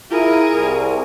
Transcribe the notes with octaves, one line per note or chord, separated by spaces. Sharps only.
E4 F4 G#4 A#4
C2